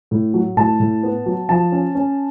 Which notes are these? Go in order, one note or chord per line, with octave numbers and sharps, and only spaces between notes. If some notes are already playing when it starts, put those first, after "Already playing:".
A2
F#3
A2 A5
A2
B3
F#3
F3 A5
C#4
C#4